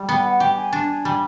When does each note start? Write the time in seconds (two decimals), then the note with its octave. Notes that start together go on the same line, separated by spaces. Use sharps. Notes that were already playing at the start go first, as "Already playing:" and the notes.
Already playing: G3
0.09 B3 G5
0.25 F#5
0.40 G4 G5
0.56 G#5
0.73 D4
1.05 G3